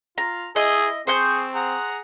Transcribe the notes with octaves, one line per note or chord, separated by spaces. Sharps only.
F4 A#5
E4 G#4 D#5 E5
C4 G#4 C5 C#6 G6
G#4 F#5 A#5